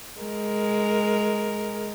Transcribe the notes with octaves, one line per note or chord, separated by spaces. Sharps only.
G#3 A#4